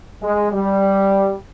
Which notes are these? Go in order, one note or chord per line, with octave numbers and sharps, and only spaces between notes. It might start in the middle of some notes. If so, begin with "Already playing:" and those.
G#3
G3